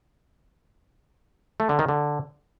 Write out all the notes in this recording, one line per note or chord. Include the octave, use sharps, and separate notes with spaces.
A3
D3
D#3
D3